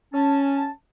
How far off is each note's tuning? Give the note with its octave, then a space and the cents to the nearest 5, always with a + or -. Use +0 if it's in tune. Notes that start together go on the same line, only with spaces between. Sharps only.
C#4 +0 A5 +0